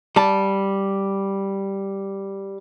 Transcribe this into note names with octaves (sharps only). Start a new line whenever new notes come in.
G3 A5